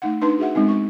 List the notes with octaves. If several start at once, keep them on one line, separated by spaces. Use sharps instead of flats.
A3 D#4 F#5
D4 D#4 B4 C6
F#4 G#4 E5 F#5
G#3 B3 C4 D#4
G#3 C#6